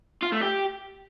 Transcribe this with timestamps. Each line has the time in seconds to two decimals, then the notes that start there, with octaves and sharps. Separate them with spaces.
0.22 F4
0.32 A3
0.41 G4